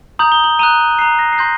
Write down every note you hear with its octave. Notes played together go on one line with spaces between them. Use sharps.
A#5 D#6 G6 F#7
G7
F#7
A#5 D#6 F#6 D#7
A#5 F#6 C7
A#6
C7
C6 G6 A#6